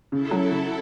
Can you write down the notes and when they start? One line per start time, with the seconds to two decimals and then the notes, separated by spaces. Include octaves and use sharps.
0.12 C#3 E4 A4
0.31 F#3
0.51 C#3